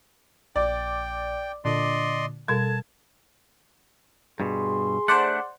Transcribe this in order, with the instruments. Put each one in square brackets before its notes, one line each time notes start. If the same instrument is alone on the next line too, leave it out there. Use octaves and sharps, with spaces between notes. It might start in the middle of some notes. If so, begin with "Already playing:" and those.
[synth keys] A#1 [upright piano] D5 [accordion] G5
[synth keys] A#2 D3 [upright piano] D4 [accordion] D5 D#5 C6
[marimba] B2 G3 [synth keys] A4 A#4 [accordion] A5 [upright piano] G#6
[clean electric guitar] G2 B2 [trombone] G#4 [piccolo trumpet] C6
[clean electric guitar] A3 D4 [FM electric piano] C5 D5 F#5